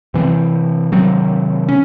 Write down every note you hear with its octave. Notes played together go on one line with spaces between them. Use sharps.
C3 E3 C4
C3 D#3 F#3 C4
C#4